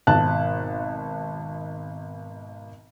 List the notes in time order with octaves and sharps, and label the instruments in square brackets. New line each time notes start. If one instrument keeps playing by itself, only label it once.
[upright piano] G#1 B2 A5 F#6